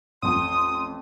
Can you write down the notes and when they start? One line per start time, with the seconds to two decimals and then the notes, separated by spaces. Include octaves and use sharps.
0.22 A1 F2 C6 D#6